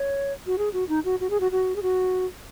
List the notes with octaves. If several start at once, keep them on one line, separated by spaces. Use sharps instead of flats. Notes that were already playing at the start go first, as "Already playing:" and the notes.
Already playing: C#5
F#4
G#4
F#4
D#4
F#4
F#4
G#4
F#4
F#4
G#4
F#4